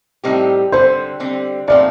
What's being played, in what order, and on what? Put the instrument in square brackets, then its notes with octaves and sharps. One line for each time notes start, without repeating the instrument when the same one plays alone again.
[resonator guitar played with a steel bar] A2 G3 C4 D#4 G4
[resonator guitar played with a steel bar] D3 G3 C4 [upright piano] C5
[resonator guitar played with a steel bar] D3 G3 C4
[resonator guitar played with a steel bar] A#2 F3 A3 C4 [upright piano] D5